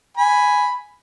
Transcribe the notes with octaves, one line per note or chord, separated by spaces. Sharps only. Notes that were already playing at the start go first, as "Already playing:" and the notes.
G#5 B5